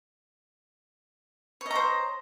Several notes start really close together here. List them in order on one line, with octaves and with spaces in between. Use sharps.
C#5 D#5 A#5 C5